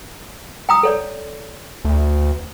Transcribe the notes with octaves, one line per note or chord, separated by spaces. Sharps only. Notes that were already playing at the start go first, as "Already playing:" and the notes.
G5 A#5 D#6
A4 C#5 D5
D2